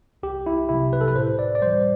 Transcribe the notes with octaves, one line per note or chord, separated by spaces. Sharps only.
C2 G4
E4
C3 F#3 E4
B4
A4
B4
A2 C5
D5
D5
E3 G3 C5